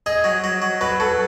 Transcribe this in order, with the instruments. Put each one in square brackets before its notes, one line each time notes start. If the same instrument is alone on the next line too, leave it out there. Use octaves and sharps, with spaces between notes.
[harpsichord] G#4 [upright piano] D#5
[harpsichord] F#3
F#3
F#3
[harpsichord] F#3 [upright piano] B4
[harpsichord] F#3 [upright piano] A4